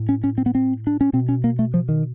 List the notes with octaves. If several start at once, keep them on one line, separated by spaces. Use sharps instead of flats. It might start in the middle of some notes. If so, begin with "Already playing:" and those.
Already playing: A2
C#4
C#4
C4
B3
C4
D4
C#4
B2 C4
C#4
A#3
A3
F3
D#3